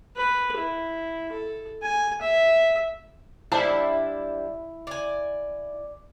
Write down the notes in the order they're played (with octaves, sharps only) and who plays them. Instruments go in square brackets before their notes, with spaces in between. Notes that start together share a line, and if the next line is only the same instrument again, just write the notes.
[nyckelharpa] B4
E4
A4
G#5
E5
[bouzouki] G3 D4 C5 [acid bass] E4 [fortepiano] A5
[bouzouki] D5 G#5